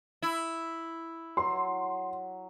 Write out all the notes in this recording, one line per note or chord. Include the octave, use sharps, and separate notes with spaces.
E4
F#3 C6